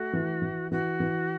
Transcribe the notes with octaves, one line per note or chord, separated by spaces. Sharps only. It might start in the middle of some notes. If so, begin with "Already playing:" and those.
Already playing: A3 F#4
E3
E3
E3 F#4
E3